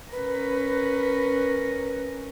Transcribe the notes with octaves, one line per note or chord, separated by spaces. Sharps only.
C#4 A#4 B4